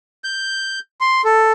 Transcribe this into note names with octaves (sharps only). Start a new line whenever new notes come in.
G6
C6
A4